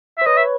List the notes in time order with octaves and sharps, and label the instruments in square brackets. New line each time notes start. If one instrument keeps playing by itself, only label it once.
[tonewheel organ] C5 [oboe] E5
[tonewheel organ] B4 C#5 [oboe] D#5
[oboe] E5